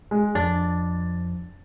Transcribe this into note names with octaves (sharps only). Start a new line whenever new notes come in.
G#3
F2 D4 A6